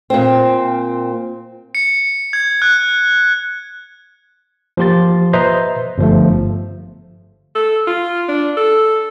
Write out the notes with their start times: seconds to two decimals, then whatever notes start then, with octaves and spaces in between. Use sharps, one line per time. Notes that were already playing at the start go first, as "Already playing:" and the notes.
0.10 A#2 C4
1.75 C#7
2.33 G#6
2.62 F#6
4.77 F3 A#3 G4 C6 A6
5.33 B4 C5 D#5 E5 A#5 C6
5.98 G1 F3 A3
7.55 A4
7.87 F4
8.29 D4
8.57 A4